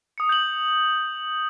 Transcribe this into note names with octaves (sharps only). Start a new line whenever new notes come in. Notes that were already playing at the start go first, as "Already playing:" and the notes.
D#6 C#7
G6 F#7